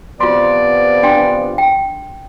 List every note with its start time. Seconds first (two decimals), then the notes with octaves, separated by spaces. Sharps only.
0.20 C3 F3 B3 F4 D5 C6
1.03 D4 G5 C6
1.58 G5